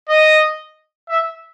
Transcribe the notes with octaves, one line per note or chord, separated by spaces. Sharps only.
D#5
E5